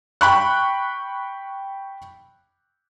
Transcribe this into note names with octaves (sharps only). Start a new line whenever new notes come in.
G5 B5 C#6 F#6